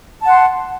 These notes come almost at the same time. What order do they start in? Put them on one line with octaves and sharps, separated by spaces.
A5 F#5 C6